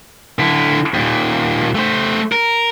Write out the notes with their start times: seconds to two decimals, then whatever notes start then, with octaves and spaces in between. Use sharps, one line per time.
0.39 D3 E4
0.94 D#2 A#2
1.75 A3 C5
2.32 A#4